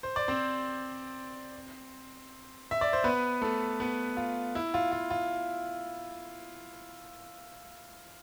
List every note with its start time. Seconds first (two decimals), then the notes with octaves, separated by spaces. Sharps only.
0.03 C5
0.16 D5
0.28 C4 C5
2.71 E5
2.81 D5
2.93 C5
3.04 B3 B4
3.42 A3 A4
3.80 B3 B4
4.17 F4
4.55 E4
4.74 F4
4.92 F4
5.10 F4